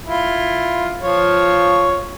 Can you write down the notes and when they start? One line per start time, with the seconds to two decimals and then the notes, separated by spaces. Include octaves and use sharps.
0.06 E4 F4
1.01 F3 F4 C#5